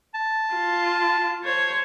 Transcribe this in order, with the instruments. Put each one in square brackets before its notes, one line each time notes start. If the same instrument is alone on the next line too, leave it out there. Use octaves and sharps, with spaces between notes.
[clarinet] A5
[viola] F4
C5 C#5